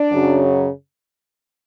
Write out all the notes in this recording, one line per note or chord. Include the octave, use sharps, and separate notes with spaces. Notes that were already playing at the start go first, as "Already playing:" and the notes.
Already playing: D4 D5
F#2 C#3 F#3